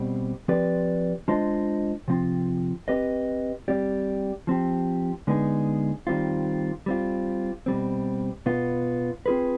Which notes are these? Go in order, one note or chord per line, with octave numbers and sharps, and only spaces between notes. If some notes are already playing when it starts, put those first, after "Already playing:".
Already playing: B2 G3 C4
F3 C4 G4 B4 D5
G#3 D4 F4 C5 D#5
C3 F3 C4 F4
C4 G4 B4 D#5
G3 C4 G4 D5
F3 C4 G4
D3 G#3 B3 D#4 G#4
D#3 G3 C4 F4
G3 C4 F4
B2 G3 C4
B2 B3 F4
C4 F4 G#4 B4